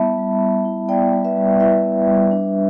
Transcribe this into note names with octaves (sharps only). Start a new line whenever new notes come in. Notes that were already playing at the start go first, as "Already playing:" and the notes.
Already playing: G3 B3 E4 E5 A5 B5
G3
G3
E4
B3 D5 G5
G3
B4 E5
G3
E4 B4 E5
B3
G3
D4